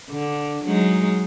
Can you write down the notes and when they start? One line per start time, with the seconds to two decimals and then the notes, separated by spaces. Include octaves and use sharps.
0.10 D3
0.65 F#3 G#3 D#4